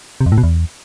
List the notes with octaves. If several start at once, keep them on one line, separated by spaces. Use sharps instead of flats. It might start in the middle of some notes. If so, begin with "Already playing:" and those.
C3
F2
A2
B2
E2